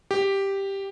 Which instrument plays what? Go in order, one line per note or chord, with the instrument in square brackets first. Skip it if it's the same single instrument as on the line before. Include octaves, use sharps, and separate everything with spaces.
[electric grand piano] G4